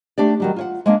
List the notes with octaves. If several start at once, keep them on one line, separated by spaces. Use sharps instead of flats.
A3 D4 G4 D5
D#3 F#3 G3
F4 C#5 F#5
G#3 A#3 C#4 D4